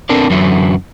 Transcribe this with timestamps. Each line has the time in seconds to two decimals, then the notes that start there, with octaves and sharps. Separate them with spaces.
0.09 B3 C4 D4 A4 A#4 D5
0.30 F#2 D3 E3 F#3 E4